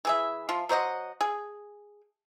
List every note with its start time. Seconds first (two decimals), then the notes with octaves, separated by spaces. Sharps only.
0.05 E3 G#4 E5
0.49 F3 F4
0.69 F#3 C5 D#5 F#5
1.21 G#4